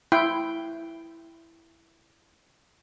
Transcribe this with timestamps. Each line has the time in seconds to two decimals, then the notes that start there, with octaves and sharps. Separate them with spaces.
0.12 E4 G5 C6